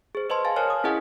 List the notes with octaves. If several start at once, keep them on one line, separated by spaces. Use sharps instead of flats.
G#4 C5
B4 C5 D#5 A5 C6
F5 G#5 A5 A6
A#4 C5 C#5 G#5 F6
D#6
C#4 E4 G#4 D#5 F#5 G#5